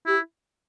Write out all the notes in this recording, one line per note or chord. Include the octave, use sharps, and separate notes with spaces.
E4 G4